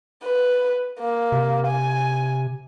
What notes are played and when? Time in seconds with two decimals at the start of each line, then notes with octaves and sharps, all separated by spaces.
0.23 B4
1.00 A#3
1.32 C3
1.67 G#5